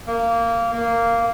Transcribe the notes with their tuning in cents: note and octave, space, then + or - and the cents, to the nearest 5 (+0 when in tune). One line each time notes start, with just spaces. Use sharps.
A#3 -15
A#3 -10